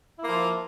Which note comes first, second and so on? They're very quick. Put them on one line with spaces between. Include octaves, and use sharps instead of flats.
E4 A#3 F3 F4